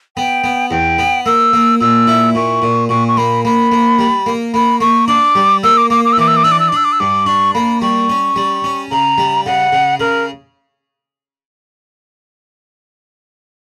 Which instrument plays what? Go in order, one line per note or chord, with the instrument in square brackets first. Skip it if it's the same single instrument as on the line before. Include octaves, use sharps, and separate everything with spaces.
[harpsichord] B3 [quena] G5
[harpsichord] B3
[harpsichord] E2 [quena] G5
[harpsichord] B3
[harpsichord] A#3 [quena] E6
[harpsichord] A#3
[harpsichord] A#2 [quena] E6
[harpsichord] E4
[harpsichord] A#2 [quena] C#6
[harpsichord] A#2
[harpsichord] A#2 [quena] C#6
[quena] C#6
[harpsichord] A#3 [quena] B5
[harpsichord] A#3 [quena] B5
[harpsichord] A#3
G3
A#3
[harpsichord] A#3 [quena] B5
[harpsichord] A#3 [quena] C#6
[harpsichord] D4 [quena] D6
[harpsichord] G3
[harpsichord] A#3 [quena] E6
[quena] D6
[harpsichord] A#3 [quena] D6
[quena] D6
E6
[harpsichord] E3 [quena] D6
[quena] E6
D6
[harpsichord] D4 [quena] E6
[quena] D6
E6
D6
[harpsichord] D4 [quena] E6
[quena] D6
E6
[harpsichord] G2 [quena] D6
[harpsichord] D4 [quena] C#6
[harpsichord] A#3 [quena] B5
[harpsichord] G3 [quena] C#6
[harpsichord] C#4
G3
C#4
[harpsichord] C#3 [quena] A#5
[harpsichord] G3
[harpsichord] C#3 [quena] F#5
[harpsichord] C#3
[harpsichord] C#3 [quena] A#4